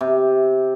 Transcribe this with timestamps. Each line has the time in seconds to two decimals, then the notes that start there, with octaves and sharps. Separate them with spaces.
0.01 C3